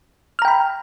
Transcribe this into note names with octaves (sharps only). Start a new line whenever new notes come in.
G5 A#5 B5 F6